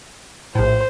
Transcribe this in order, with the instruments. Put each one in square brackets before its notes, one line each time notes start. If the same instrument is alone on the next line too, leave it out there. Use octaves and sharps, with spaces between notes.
[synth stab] A#1 A2 [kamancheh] C5